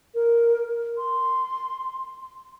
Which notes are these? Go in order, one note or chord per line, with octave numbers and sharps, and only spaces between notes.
A#4
C6